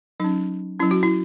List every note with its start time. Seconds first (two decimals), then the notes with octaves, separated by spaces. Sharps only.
0.20 F#3 C#4 D#4
0.80 F#3 C#4 E4
0.91 F#4
1.03 E4